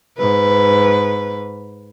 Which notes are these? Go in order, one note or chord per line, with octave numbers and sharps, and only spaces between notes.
G#2 B4